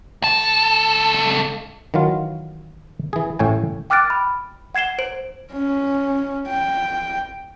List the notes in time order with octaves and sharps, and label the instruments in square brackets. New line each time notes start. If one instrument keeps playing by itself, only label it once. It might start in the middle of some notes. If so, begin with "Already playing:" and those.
[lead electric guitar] C#2 A4
[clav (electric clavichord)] D#3 E3 F#3 F4
E3 G#4
A1 A2 C#5 G5 G#5
[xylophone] G5 D6 F6 F#6 A6 D7
B5
F#5 G#6 C7 E7 G7
C5 D7 F#7
[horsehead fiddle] C#4
G5